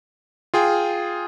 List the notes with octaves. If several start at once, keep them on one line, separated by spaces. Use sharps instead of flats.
F4 G#4 G5